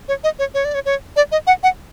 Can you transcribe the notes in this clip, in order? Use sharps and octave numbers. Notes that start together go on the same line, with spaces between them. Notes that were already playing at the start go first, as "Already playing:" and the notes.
C#5
D#5
C#5
C#5
D5
C#5
C#5
D5
D#5
F#5
F#5